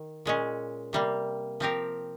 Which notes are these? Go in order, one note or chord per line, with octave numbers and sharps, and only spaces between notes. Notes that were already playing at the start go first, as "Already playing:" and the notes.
Already playing: D#3
A#2 G#3 C#4
C3 G3 A#3
F3 C4 G4 A#4